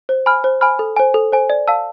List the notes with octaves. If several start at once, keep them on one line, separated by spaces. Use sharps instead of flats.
C5
G#5 B5 F6
C5
G#5 B5 F6
A4
C5 G#5
A4
C5 G#5
D5
F5 A5 E6